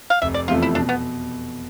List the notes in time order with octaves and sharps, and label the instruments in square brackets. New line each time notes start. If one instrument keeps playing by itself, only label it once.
[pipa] F5
[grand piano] F1 [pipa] E5
[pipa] D5
[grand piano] E2 C3 F3 A3 [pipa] F4
[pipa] E4
[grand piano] B2 [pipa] D4
[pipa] B3